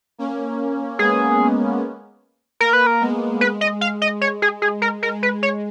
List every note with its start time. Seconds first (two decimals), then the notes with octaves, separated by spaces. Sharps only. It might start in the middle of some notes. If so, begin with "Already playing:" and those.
0.18 A#3 C#4
0.99 G#3 B3 G#4
2.60 A#3 A#4
2.73 B4
2.87 A#4
3.01 G#3 B3
3.41 G#3 B4
3.61 D#5
3.81 F5
4.02 D#5
4.21 C#5
4.42 G#4
4.62 G#4
4.82 A#4
5.03 G#3 A#4
5.23 B4
5.43 C#5